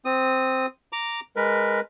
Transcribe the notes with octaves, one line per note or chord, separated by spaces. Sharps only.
C4 D#6
A#5 D6
G#3 A#4 B4